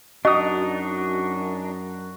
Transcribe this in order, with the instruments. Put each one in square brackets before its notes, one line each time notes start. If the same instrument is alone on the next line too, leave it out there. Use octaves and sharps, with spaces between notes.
[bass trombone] F#2 [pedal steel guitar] D4 D#4 [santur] F#4 [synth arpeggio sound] D#5 D#6